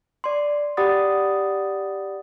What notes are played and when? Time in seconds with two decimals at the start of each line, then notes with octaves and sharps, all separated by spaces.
0.24 D5 C6
0.77 G4 D5 F#5 B5 D#6 A6